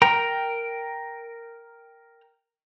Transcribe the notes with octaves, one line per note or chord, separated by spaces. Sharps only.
A#4 G5 A#5